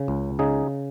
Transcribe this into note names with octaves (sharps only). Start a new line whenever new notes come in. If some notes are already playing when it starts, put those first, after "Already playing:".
Already playing: C#3
C#2
C#3 D#4 G#4